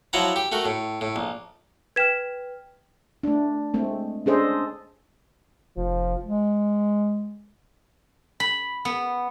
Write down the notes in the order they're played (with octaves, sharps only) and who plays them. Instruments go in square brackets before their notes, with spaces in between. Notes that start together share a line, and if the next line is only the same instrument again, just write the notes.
[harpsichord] F3 F#3 E4 F#5 A5 A#5
G4
A3 F#4 A#4
A2
A2
A#1
[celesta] B4 G5 F6 [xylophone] G#6 B6 E7
[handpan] A3 D4
G#3 A3 C4
C#4 D4 G#4 A4 C5 D#5
[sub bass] F1 [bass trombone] F3
[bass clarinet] G#3
[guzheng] B5
B3